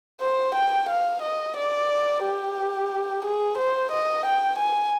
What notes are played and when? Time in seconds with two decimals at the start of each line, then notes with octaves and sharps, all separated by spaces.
0.21 C5
0.55 G5
0.89 F5
1.22 D#5
1.56 D5
2.23 G4
3.24 G#4
3.58 C5
3.91 D#5
4.26 G5
4.58 G#5